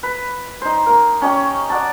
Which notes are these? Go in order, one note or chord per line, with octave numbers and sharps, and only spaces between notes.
B4
D#4 C5
A#3 A#4
C#4 G4 D#5 C#6
D5 F#5 A5